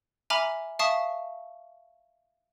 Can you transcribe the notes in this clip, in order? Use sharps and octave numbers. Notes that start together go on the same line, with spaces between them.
E5 G#5 A#5 B5 D6 F6
E5 F5 A5 C#6 D#6